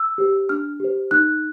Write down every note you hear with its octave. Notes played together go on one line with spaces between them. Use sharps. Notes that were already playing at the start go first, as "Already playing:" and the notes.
Already playing: E6
G4 C5
D4 F6
G4 C5
D#4 F#6